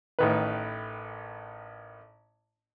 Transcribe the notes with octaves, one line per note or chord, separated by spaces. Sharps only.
A1 D#3 B4